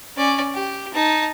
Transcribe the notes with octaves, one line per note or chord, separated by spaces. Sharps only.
C#4 D5
G4
D#4 A5